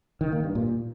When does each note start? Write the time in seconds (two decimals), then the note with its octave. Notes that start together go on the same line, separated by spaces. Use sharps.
0.21 D#3
0.32 A#3
0.44 G2
0.55 A#2